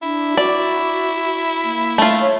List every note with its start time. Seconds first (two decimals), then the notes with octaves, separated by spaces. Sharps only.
0.02 D4 E4
0.37 F#4 D5
1.64 A#3
1.98 A3 F4
2.21 C#5